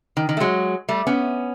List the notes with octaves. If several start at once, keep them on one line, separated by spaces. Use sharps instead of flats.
D#3
D#3
A3
F#3 G#3
G3 A3
B3 C#4